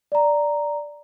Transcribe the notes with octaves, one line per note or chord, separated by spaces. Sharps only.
D5 A#5